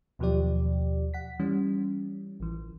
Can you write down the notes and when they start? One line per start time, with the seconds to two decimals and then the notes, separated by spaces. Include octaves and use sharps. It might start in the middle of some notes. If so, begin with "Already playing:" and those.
0.19 D#2 B2 F3 F#3 G4 D5
1.14 F#5 B6
1.39 E3 G3 C#4
2.40 A1 E3